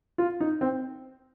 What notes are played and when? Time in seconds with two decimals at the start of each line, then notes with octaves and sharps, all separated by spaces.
0.18 F4
0.41 D#4
0.61 C4